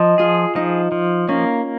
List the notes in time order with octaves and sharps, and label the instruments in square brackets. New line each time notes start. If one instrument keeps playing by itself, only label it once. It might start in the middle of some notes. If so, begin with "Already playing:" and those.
Already playing: [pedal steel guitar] F3 [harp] D#5
[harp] F4 [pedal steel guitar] G#4
[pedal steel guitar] F3 [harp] D#4
[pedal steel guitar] F3
[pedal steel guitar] A#3 [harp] C#4